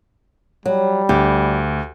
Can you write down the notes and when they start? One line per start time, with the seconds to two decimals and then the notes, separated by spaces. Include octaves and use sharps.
0.66 F#3 G3
1.09 D2 G4